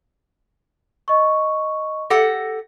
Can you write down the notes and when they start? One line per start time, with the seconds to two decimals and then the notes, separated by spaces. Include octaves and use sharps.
1.08 D#5 C#6
2.10 G4 A4 F#5 A#6